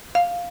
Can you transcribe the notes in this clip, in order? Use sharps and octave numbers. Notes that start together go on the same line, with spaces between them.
F5